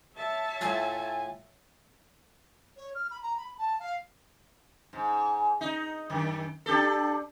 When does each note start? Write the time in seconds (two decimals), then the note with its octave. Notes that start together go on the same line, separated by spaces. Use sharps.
0.15 C#5 E5 A5
0.61 A2 F4 G#5
2.76 C#5
2.95 F6
3.10 B5
3.22 A#5
3.37 B5
3.58 A5
3.79 F5
4.93 G#2
5.61 D#4
6.10 F#2 D#3
6.66 D4 G4 A4